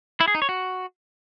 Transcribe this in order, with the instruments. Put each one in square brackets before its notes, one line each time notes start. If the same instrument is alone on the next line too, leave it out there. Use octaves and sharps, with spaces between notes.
[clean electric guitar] E4
G#4
D#4
C#5
F#4